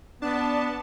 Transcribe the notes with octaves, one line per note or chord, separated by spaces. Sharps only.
B3 D4 A5